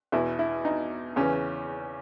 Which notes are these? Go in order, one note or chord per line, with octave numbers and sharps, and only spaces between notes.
E2 B2 E4
E4
D#4
E2 C#3 E3 C#4